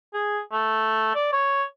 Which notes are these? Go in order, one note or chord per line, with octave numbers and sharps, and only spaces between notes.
G#4
A3
D5
C#5